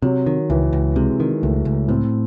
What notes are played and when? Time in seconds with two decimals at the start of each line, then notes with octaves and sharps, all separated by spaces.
0.02 C3 F#3
0.26 D#3
0.50 C#2 E3
0.73 C#2
0.96 C3 G#3
1.20 D#3
1.43 C#2 A3
1.65 C#2
1.89 A2 C4